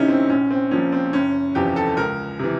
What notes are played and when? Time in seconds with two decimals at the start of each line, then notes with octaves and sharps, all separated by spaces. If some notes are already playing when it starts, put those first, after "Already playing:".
Already playing: D2 C3 D#3 C#4 D#4 E4
0.08 C4
0.30 A#1 C#4
0.51 C4
0.71 A#2 F3 C#4
0.92 C4
1.13 F#1 C#4
1.55 E2 C3 F3 G4
1.76 A4
1.97 C#2 A#4
2.39 C3 E3